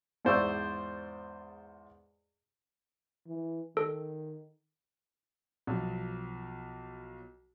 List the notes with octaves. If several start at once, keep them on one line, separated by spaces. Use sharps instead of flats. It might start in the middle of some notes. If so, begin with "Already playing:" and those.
E2 G#2 C5 D5 C#6 E6
E3
D#3 A4
B1 F3